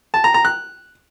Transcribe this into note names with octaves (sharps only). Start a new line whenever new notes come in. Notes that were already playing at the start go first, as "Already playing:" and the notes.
A5
A#5
A#5
F#6